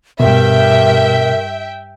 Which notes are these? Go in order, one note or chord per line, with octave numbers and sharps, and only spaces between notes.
G2 B2 A#4 E5 G5